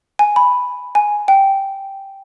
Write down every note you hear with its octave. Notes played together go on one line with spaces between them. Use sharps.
G#5
B5
G#5
G5